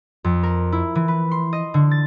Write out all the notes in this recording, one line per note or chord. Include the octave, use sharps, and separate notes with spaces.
F2
A#4
E4
E3
B4
C6
D#5
D3
A6